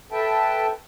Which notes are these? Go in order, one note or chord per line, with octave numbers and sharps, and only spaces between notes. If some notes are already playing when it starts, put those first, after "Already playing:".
A4 B4 E5 G5 A5